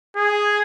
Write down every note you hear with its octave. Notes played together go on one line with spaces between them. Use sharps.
G#4